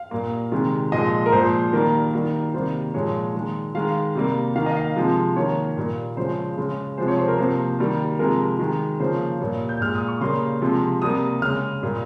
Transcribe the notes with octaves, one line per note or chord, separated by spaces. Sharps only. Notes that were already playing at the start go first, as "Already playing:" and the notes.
Already playing: F5
A#2 G3 A#3
C3 D#3 G#3
A#2 F3 G#3 D#5
A#4
A#2 F3 G#3 C5
D#3 G3 A#3 A#4
D#3 G3 A#3
C3 D#3 G3 A#3 C5
A#2 F3 G#3 C#5
D#3 G#3
D#3 G#3 F5
C3 G3 A#3
D#3 A#3 F5
D#5
F5
C3 F3 G#3
D#3 A#3 C#5
A#2 G3 A#3
C#3 F3 G#3 C5
C#3 G#3
C3 F3 G#3 C5
C#5
C5
A#4
C3 F3 A#3 C5
D#3 G3 A#3
C3 F3 G#3 A#4
D#3 G#3
C#3 F3 A#3 C5
A#2 G3 A#3 C#5
G6
A#2 G#3 F6
D#6
C#6
C#3 G3 A#3 C6
C3 F3 G#3
C3 G3 A#3 D#6
C#3 G#3 F6
A#2 G3 A#3